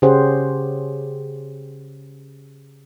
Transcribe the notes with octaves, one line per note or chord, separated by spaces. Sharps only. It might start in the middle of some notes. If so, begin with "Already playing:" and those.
C#3 C#4 G4 G#4 C5 F#5